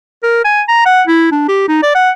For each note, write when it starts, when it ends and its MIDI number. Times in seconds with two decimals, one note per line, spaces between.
0.23 0.44 70
0.45 0.62 80
0.68 0.83 82
0.86 1.02 78
1.07 1.29 64
1.31 1.44 62
1.48 1.63 67
1.68 1.81 63
1.83 1.95 74
1.95 2.10 78